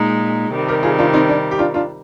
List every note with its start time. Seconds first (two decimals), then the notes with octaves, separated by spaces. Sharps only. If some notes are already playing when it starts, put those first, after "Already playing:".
Already playing: A#2 G#3 D#4
0.52 C3 D#3 G3
0.68 G4 A#4
0.83 F4 G#4
0.98 D4 F4
1.13 C4 D#4
1.29 D4
1.51 G4
1.59 D4 F4
1.74 D4 F4